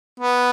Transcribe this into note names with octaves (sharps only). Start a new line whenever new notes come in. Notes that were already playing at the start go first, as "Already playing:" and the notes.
B3